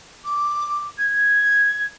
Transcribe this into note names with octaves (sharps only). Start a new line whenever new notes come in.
D6
G#6